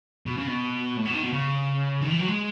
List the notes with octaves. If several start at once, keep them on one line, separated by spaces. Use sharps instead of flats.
B2
C#3
B2
A2
B2
D#3
B2
C#3
D#3
E3
F#3
G#3